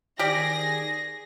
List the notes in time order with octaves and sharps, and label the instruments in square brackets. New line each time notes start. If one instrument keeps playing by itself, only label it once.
[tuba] D#3 [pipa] G4 D5 [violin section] G#4 A#6